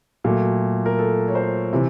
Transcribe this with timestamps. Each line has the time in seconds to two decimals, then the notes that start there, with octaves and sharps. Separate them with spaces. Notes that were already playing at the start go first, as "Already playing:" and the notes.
0.24 A#2 F#3 A3
0.86 A#4
0.99 A4
1.28 C#5
1.35 C5
1.73 C3 E3